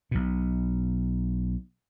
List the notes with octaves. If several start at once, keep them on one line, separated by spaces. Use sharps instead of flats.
B1 B2